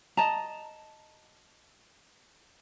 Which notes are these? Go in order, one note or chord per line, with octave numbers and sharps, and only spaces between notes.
D#5 A5 A#5